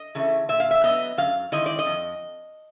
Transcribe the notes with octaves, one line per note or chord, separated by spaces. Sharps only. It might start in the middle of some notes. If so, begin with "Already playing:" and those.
Already playing: D#5
C#3 E3 A3
A#2 E5
F5
E5
F#3 B3 D#5
F#2 F5
D#3 G#3 C4 E4 D#5
D5
D#5
F2